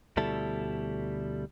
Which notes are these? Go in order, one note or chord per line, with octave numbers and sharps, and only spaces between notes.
D2 B2 G3 E4 A4